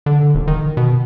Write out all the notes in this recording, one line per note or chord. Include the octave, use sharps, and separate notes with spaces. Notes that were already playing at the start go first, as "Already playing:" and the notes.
D3
D#1
D#3
B2